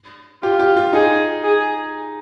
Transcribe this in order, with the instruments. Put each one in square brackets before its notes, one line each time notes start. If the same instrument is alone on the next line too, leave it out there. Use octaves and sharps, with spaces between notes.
[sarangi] F4 [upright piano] G4
[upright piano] G4
F4
[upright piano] D#4 [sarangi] G#4
[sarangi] G#4